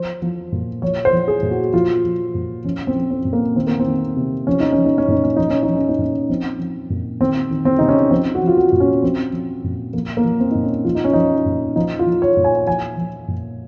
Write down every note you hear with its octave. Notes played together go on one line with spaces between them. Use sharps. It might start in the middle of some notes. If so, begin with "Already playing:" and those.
Already playing: F3 C5
F3
A#2
F3 C#5
C5
F3
G#4
A#2
F#4
F3 F4
F3
A#2
F3 C#4
C4
F3
C4
A#2
A#3
D#3 C4
A#3
C4
D#3
C3
F3 C#4
D#4
F3 C#4
D#4
C#4
A#2 D#4
C#4
F3 D#4
C#4
D#4
F3
C#4
D#4
A#2 C#4
F3 C4
F3
A#2
D#3 C4
D#3
C4
C3 D#4
C#4
F3 C4
F#4
F3
F4
F#4
A#2
C#4
F3 C4
F3
A#2
F3 A#3
A#3
F3
C4
A#2 D#4
C#4
F3 F4
D#4
C#4
F3 D#4
A#2
F3 D#4
F4
F3
C#5
A#2
G#5
F3 G#5
F3
A#2